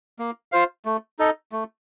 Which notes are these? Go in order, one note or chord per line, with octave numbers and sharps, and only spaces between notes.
A#3
F4 C5 F5
A3
D#4 A4 D#5
A3